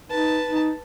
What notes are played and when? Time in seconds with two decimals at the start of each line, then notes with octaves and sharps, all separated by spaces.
0.10 D#4 B4 A5
0.48 D#4